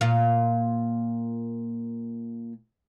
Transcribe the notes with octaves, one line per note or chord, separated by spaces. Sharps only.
A#2 F4